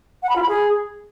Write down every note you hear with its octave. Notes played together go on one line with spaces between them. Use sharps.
F#5
B5
F4
B5
G#4